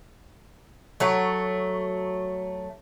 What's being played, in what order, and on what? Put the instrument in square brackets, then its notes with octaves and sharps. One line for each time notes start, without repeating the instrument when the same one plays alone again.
[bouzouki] F#3 A3 C#5